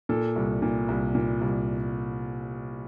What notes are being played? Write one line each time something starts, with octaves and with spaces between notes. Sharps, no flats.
A#2 A4
C2
A#2
C2
A#2
C2